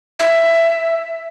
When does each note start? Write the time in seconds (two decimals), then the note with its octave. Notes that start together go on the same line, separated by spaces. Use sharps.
0.19 E5